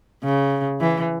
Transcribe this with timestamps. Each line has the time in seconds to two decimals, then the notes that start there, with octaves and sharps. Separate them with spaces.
0.23 C#3
0.81 E3